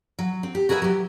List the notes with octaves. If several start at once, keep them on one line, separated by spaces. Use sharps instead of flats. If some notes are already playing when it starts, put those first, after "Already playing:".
F#3
C4
G4
F#4 G#4 A#4 B4 E5
F#3 G4